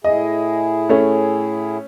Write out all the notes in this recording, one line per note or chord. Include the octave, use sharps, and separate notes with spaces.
A2 E4 G#4 D#5
A3 C#4